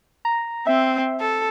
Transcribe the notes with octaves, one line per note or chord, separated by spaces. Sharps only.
A#5
C4 E5
A4